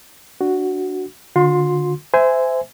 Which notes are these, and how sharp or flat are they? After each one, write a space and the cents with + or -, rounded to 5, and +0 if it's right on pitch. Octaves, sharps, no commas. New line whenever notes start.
D4 +0 F#4 +0
D3 +5 F4 +45 C6 +0
C5 -25 E5 +0 G#5 +0